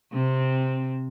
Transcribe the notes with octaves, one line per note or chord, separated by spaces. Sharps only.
C3 C4